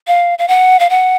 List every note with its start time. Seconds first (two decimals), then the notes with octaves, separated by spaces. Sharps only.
0.07 F5
0.39 F5
0.48 F#5
0.80 F5
0.90 F#5